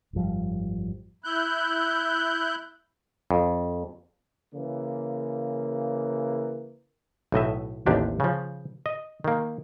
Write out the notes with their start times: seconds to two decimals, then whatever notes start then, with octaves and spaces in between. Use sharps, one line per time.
0.13 G#1 F#2 F3 G3
1.24 E4 F#6 G6
3.31 F2
4.53 C#3 E3 A#3
7.32 B1 A2 D#5 E5
7.86 A1 D#2 C3 D4 G4
8.20 C#3 F3
8.86 D#5
9.24 D#3 A#3